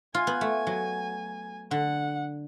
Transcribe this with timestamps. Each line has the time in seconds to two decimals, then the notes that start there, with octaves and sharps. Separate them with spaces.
0.14 F4 G#5
0.27 B3
0.41 A3
0.67 F#3
1.71 D3 F#5